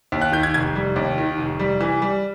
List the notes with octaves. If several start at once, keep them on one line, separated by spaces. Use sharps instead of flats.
D#2
F#6
D#3 G6
G#6
F1 G#6
G3
D#2
D#3
F1
G3
E3
G3